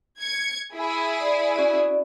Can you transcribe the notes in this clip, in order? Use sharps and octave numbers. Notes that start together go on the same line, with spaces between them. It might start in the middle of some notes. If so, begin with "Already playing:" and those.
G#6 C#7
E4 G#4
D5
C#4 F#4 D5